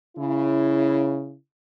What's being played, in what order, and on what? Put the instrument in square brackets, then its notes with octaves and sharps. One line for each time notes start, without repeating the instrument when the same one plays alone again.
[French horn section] C#3 E4